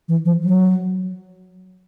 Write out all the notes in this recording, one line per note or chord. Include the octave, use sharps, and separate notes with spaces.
E3
F3
F#3